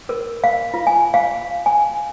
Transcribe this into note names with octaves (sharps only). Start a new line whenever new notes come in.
A#4
F5
F4
G#5
F5
G#5